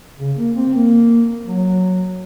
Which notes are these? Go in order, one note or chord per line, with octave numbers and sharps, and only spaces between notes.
C#3
A#3
C4
A#3
F#3